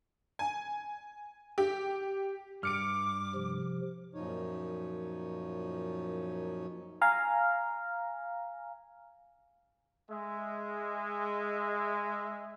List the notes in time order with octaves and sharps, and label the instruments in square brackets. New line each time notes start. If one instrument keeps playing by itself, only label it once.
[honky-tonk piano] G#5
G4
[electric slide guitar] G2 [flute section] D6 [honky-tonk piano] F6 C#7 D7
[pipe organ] C3 F3
[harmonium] F#2 A#2 F3 D#4 C#5
[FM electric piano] F5 G#5 A#5
[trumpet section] G#3 E5